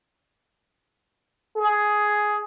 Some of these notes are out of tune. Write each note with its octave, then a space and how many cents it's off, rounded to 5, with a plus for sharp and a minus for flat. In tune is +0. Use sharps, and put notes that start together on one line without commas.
G#4 +10